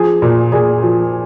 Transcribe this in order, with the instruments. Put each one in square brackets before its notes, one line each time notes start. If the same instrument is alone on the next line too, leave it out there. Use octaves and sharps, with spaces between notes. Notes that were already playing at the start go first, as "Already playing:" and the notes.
Already playing: [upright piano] F3 G#4
A#2
A#2 G#4
F3